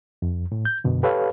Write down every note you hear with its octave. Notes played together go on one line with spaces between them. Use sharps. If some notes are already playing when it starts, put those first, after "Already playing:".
F2
A2
G6
F#2 B2 D3
G4 A4 B4 C#5 F5